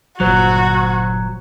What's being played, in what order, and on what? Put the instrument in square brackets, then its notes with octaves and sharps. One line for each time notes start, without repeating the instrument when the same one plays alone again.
[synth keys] G1 A#2 C5 [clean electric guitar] F#3 [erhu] F#4